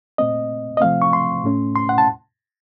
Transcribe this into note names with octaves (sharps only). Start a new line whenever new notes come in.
A#2 A3 C4 D#5
D#5
C3 F3 A3 C4 F5
C#6
C6
A2 A3 C#4
C6
F#5
A5